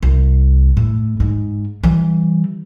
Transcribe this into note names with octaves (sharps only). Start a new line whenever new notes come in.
C2
A2
G#2
E3 G3